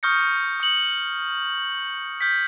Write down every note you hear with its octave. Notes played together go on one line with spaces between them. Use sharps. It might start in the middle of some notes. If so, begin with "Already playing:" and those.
C#6 D#6 F6 G6 A#6 C#7
D#6 C#7 F#7
F6 G6 G#6 B6